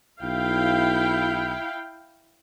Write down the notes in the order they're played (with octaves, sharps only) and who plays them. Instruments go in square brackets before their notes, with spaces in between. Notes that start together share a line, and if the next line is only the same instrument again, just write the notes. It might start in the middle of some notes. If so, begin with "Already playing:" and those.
[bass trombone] B1 [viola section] E4 F5 G5